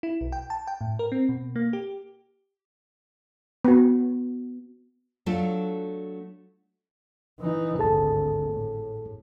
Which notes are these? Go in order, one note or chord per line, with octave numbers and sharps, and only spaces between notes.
E4
B1
G5
A5
G5
A2
A#4
C4
B2
A#3
G4
B3 F#4
F#3 A3 D4 F4 A4
E3 D#4
G#1 D2 G#4 A4 A5
A2